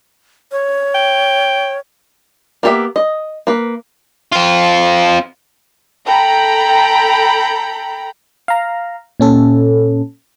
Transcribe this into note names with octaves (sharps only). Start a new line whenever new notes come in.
C#5
G5
A#3 B3 G4 A#4 E5
D#5
A#3 B4
C4 F4
A4 G5 A#5 B5
F5 A#5
A#2 C#4 A4